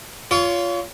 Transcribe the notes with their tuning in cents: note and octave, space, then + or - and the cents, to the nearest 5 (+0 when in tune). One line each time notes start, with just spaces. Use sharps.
F4 +0 C#5 +35